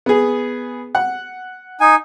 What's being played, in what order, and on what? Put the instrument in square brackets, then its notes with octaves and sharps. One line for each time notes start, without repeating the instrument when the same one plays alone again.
[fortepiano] B3 G#4
F#5
[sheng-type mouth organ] D#4 G#5